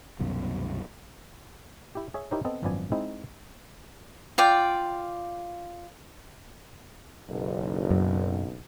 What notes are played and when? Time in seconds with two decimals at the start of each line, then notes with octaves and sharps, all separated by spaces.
0.19 C2 F#2 B2 D#3
1.95 E4 G4
2.14 G#4 C#5 E5
2.31 D#4 E4 G4 A#4 C5 C#5
2.45 B3 C4 A4 D#5
2.63 G#1 F#2 F3 B3 D5 G#5
2.92 G#3 C4 D#4 E4
4.38 F4 D5 G5
7.29 F#1 B1
7.90 F#2